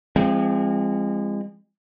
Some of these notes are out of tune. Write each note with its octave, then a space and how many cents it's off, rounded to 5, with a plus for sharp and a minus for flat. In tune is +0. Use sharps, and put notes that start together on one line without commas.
F3 -35 G#3 -30 C4 +10